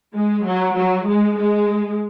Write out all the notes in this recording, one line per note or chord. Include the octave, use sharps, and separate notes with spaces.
G#3
F#3
F#3
G#3
G#3